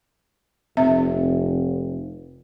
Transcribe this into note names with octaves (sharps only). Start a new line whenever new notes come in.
F1 C4 E5